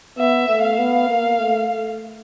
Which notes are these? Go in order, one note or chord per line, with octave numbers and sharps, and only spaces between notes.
B3 E5
A3
F5
B3
A#3
A3
A3